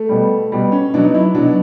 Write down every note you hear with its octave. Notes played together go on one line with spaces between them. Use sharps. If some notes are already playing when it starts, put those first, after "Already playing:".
Already playing: A3
B2 G3
B2 G3
C#4
B2 F#3 D4
D#4
E4
B2 F#3 D4